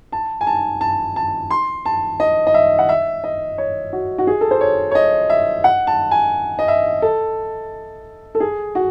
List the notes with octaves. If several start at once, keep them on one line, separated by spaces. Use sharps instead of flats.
A5
G#5
A5
A5
A5
C6
A5
D#5
D#5
E5
F#5
E5
D#5
C#5
F#4
F#4
G#4
A4
C5
C#5
C#5
D#5
E5
F#5
A5
G#5
D#5
E5
A4
A4
G#4
F#4